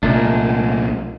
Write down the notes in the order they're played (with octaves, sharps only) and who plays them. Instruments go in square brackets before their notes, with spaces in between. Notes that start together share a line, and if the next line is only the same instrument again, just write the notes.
[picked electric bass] C2 A#2 [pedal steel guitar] G#3 A3 D4